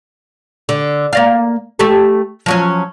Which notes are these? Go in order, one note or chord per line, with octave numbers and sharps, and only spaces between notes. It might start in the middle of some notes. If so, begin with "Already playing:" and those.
D3
A#3 D5 F5
A3 G4 A4
F3 F#3 C#4